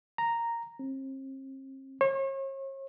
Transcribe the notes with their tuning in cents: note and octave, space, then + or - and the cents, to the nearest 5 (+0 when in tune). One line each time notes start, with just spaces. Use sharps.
A#5 -5
C4 +40
C#5 -40